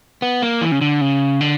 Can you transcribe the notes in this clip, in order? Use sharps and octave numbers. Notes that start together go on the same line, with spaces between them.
B3
A#3
E3
C#3
D3
C#3
D3